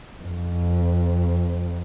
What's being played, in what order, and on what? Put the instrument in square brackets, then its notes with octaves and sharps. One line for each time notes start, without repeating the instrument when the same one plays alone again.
[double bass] F2